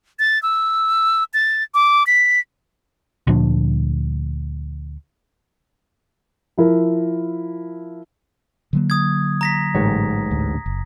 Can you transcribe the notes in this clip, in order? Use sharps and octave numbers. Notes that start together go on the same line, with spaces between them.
A6
E6
A6
D6
B6
D2 A#2 F3 D4
F3 E4 A#4
D3 F#3 A#3
D#6 G#6
A#5 A#6 B6
A1 G#2 C#5
D2 A2 D3
F#1